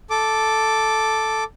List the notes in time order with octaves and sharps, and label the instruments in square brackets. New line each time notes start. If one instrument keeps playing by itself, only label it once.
[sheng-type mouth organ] A4 D6